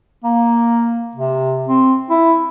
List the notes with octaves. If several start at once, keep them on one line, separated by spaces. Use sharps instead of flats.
A#3
C3
C4
E4